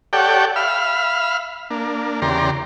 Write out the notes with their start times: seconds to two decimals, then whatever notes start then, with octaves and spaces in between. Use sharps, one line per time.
0.13 G4 A4 C#5 D5 F#5 G5
0.56 E5 F5 B5 F6
1.70 A#3 D4
2.22 E2 C#3 G4 D5 A#5 C6